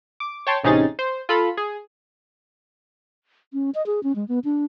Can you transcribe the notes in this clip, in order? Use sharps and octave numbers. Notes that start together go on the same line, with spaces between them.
D6
C#5 G5 A5 C6
A1 C3 C#4 D#4 G#4 A6
C5
F4 A4 B5
G#4
C#4
D#5
G#4
C#4
G#3
B3
D4